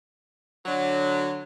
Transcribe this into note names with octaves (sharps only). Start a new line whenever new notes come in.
D3 F#3